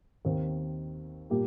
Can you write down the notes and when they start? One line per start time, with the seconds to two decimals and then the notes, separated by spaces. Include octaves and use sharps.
0.25 D#2 D#3 C4
1.30 A#2 G3 A#3 G4